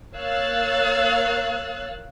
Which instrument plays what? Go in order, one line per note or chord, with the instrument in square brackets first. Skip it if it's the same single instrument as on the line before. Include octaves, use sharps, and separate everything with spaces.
[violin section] A#3 C#5 F5 E6 F#6 A6